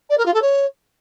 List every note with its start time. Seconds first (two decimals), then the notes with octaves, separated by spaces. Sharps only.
0.09 D5
0.17 A#4
0.25 F4
0.34 A4
0.42 C#5